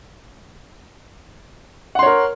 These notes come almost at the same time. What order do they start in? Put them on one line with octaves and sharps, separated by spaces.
F#5 C6 C#5 A#4